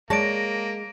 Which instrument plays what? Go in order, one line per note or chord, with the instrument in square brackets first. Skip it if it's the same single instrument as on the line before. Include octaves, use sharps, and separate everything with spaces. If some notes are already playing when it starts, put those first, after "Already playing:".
[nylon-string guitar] G#3 [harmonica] A#3 [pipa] C#5 D5 A5 [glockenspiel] A#6 D7